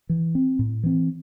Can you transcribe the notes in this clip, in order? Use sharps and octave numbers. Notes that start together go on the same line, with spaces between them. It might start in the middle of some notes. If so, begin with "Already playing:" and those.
E3
C4
A2
E3 C4